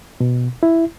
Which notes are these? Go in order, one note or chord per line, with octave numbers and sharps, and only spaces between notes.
B2
E4